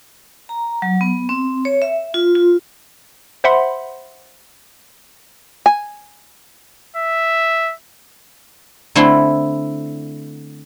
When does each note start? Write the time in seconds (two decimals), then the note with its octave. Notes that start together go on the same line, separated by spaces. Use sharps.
0.49 A#5
0.82 F#3
1.01 B3
1.29 C4
1.65 C#5
1.82 E5
2.14 F4
2.35 F4
3.44 C5 E5 F#5 B5 C6
5.66 G#5
6.96 E5
8.95 D3 A3 C4 D4 E4 C6